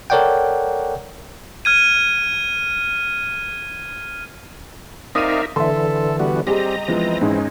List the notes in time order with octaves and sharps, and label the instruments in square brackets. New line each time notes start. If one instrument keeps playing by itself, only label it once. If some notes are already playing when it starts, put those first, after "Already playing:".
[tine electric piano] A4 A#4 C#5 D5 F#5 G5
[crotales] F6 G#6 D#7
[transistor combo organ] C4 D5 F5 [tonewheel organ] D#4 A#4 E5 [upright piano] D#6 D#7
[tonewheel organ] D3 E3 [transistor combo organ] A4 [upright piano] E5 C6
[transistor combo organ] G3 B3 F#4
[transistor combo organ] G3 C4 [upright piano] G4 G#4 [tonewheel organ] D#5 A#5
[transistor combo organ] E3 C4 [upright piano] F3 G#3 B3
[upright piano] G#2 [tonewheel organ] G#3 C#4 D#4